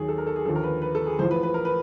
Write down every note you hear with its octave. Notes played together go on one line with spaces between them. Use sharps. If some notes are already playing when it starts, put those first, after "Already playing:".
Already playing: D#2 D#3 F#3 G#4
A4
A#4
A4
G#4
D#2 D3 F3 A4
A#4
B4
B4
A4
G#4
A1 A2 F3 C5
B4
B4
A#4
B4